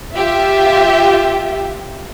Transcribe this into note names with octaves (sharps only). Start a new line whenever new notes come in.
F4 G4 E5